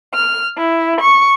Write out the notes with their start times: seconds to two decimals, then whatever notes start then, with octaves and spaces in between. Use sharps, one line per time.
0.14 F6
0.56 E4
1.01 C#6